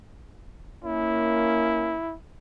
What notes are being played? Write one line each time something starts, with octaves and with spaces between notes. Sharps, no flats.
A#3 C#4 E4